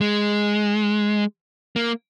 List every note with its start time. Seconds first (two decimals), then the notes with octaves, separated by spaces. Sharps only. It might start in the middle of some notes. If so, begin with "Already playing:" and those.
0.01 G#3
1.76 A#3